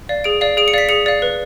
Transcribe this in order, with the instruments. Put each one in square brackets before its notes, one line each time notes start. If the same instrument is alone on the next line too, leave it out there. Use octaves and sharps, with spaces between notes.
[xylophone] D5 F5
G#4 D7
D5 F5
G#4 D7
C#7
D5 F5 B6
G#4 C#7
D5 F5
B4